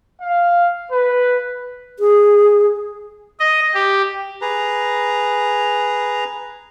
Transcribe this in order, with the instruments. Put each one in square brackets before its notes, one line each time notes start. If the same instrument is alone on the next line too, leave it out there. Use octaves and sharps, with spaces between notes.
[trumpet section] F5
B4
[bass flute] G#4
[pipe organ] D#5
G4
[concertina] G#4 B4 A#5